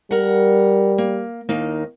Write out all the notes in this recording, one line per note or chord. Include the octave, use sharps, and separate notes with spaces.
G3 A#4 F#5
A#3
D#2 A#3 D#4